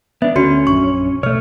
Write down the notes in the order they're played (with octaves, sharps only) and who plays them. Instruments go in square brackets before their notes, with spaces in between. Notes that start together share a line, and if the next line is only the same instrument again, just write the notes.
[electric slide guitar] B3 D4 [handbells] E5
[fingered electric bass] D2 D3 [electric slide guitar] C#4 [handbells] F#4 C6 C#7
[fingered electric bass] A#1 F#2 D4 [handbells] C#6
[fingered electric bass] B2 [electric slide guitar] A3 C#5 [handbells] F6